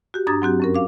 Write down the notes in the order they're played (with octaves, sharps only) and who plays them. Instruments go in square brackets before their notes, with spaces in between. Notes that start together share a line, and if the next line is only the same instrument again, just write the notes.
[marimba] F#4 G4
G2 D4 A#5 D#6 G#6 A6
F#3 C4 F#4 G4
F#2 C#4 A#4
F5 D6